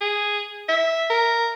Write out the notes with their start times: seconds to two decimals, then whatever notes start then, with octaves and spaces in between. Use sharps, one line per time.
0.01 G#4
0.69 E5
1.10 A#4